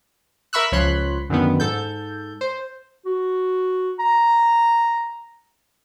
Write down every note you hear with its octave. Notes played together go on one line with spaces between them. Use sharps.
A#4 E5 B5 C#6 E6 F#6
C#2 F3 C#5 B5 C6 F#6
F#2 D3 D#3 B3
G#2 A4 G6
C5
F#4
A#5